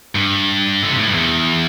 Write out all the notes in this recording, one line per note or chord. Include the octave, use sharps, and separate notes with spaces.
G2
D3
C3
A2
G2
E2